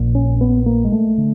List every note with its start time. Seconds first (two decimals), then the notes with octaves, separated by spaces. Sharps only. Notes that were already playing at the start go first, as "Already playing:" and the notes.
Already playing: A#1 A#2
0.15 C#4
0.41 B3
0.66 A#3
0.84 G#3
0.92 A3
1.18 D3